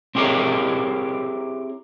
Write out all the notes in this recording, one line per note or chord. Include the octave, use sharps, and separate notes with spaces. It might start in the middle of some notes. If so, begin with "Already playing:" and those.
C4 E4 G4 G#4 A#4 C#5